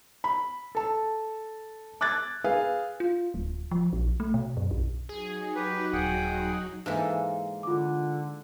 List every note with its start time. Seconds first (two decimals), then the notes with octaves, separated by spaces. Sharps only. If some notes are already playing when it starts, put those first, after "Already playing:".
0.24 B5
0.75 A4 A5
2.01 D6 F#6 G#6 A6
2.44 G#4 B4 F5
3.00 F4
3.34 D1
3.71 F3
3.93 A#1
4.20 A3
4.34 B2
4.57 F#2
4.71 B1
5.09 F#3 D#4 F#4 G#4
5.56 G4 B4
5.93 D#1 G#4 F#5 G5
6.86 G#2 E3 G#3 A#3 A4
7.63 D3 F4 D6